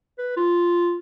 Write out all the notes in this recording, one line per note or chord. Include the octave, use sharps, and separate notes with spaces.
B4
F4